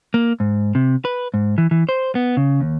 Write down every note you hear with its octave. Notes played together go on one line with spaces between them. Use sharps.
A#3
G#2
C3
B4
G#2
E3
E3
C5
B3
C#3
D#2